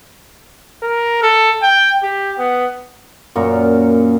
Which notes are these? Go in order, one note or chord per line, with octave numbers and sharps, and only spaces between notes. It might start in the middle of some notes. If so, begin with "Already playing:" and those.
A#4
A4
G5
G4
B3
F#2 A#2 A#5